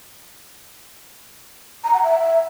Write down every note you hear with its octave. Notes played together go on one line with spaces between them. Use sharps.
A#5
F#5
E5